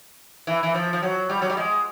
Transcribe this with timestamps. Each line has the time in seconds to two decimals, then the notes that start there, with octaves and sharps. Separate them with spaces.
0.47 E3
0.63 E3
0.74 F3
0.93 F3
1.03 F#3
1.30 G3
1.42 F#3
1.50 G3
1.57 G#3